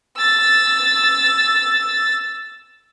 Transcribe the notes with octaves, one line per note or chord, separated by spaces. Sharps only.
E6 A6